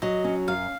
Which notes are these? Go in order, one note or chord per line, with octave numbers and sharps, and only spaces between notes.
F#3 D#5
C#4
F#2 F5